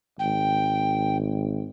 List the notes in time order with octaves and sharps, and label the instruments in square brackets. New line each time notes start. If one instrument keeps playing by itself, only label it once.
[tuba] G#1 [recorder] G5